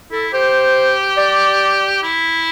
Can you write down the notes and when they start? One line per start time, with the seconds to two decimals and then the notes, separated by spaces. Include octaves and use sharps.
0.12 E4 A4
0.33 G4 C5
1.17 D5
2.03 E4